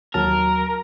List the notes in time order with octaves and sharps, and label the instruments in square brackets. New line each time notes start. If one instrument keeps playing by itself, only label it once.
[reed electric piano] D#2 F#3 A5 [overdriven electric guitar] A#4